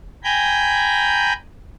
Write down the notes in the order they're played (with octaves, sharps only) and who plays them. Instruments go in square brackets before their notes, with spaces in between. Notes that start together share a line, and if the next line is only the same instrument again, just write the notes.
[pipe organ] G5 G#5 A#5 B5 G6